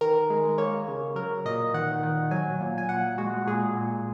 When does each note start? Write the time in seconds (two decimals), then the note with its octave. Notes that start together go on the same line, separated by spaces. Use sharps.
0.01 D#3 A#4
0.30 G#3
0.58 A#3 C#5
0.88 C#3
1.16 F#3 A#4
1.45 A#2 D#5
1.74 D#3 F#5
2.03 D#3
2.31 F#3 G#5
2.61 A#2
2.78 G#5
2.89 A#2 F#5
3.18 G#3 F#4
3.47 A#2 G#4
3.76 A#2